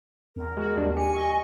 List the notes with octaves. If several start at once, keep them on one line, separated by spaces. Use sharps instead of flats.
E2 A#4
G#3 F#4
D#2 G3 D4
G4 G#5 C#7
D#5 C#6